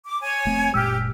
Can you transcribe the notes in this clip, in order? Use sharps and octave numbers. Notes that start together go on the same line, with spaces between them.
D6
C#5 G#5
F1 A3 C4
F#1 A#2 G#3 G4 E6 F6